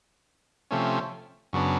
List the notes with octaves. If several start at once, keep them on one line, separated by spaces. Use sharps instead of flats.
C3 F3 A3 C#4
F#2 C#3 F#3 B3 D4